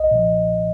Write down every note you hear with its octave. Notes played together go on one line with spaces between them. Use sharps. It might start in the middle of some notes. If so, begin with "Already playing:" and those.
Already playing: B1 D#5
A#2 F3